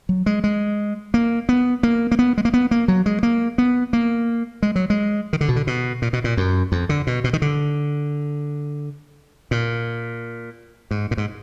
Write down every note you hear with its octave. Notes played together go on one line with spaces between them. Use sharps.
F#3
G#3
G#3
A#3
B3
A#3
A#3
B3
G#3
A#3
B3
A#3
F#3
G#3
A#3
B3
A#3
G#3
F#3
G#3
D#3
D3
B2
D3
B2
A#2
B2
A#2
F#2
F2
D3
B2
B2
D#3
D3
A#2
G#2
A#2
G#2